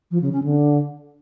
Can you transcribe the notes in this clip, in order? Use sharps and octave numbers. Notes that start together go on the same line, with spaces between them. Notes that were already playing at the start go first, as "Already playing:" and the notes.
F3
C#3
C#4
D3